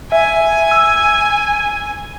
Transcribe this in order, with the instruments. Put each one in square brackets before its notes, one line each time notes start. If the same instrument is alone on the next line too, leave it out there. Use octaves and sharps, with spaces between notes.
[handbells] E5 [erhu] G#5
[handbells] E6